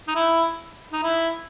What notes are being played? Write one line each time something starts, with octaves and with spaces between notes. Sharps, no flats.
D#4
E4
D#4
E4